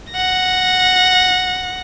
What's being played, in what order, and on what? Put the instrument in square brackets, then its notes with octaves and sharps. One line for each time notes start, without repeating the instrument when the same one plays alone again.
[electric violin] F#5 A#6